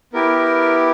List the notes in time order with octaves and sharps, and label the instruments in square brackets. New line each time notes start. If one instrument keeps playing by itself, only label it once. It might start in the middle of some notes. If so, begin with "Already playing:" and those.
[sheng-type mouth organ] B3 E4 G4 A#4